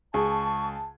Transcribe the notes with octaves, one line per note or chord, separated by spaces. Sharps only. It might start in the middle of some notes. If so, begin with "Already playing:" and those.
C#2 G#4 A5 C#6